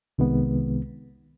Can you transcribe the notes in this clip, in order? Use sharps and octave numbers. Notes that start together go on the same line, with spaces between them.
C2 C3 D#3 G#3 B3